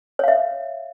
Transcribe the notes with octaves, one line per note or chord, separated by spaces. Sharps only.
C#5 E5 F5